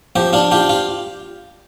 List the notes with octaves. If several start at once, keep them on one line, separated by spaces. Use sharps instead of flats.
F3 G4
D4 F4
F4 G4
F4